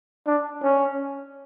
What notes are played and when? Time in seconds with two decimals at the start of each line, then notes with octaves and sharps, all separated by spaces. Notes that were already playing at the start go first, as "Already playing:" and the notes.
0.27 D4
0.63 C#4